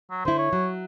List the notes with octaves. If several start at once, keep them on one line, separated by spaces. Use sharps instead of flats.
F#3
D3 E4 C5
C#5
F#3